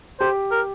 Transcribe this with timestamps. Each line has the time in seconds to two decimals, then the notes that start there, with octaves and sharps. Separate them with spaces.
0.20 G4 C5
0.52 A#4